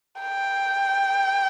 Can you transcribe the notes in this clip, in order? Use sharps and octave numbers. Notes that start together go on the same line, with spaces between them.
G5